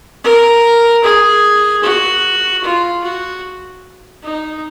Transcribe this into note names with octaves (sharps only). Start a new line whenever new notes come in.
A#4
G#4
F#4
F4
F#4
D#4